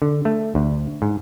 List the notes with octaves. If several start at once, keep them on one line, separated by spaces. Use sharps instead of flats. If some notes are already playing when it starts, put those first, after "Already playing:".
D3
A3
D2
G#2